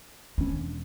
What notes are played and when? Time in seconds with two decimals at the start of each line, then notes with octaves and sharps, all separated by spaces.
0.38 D#2 C#4 D4
0.54 E1